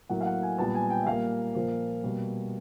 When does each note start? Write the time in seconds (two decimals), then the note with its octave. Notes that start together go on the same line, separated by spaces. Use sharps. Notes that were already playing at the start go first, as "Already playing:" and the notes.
0.09 A2 F#3 A#3 F#5
0.21 F5
0.26 F#5
0.42 G#5
0.58 A#2 G3 B3 A5
0.75 G#5
0.90 G5
1.02 E5
1.07 A#2 G3 A#3 F5
1.54 A#2 F3 A#3
2.03 B2 G3 A#3